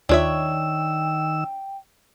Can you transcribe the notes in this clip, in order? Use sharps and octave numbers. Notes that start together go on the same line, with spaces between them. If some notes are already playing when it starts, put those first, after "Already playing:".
D#2 D#3 D4 F4 C#5 E5 G5 E6